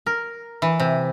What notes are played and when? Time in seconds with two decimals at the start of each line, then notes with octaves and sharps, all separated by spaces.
0.06 A#4
0.62 E3
0.80 C3